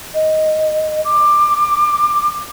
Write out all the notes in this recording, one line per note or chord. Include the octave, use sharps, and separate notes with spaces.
D#5
D6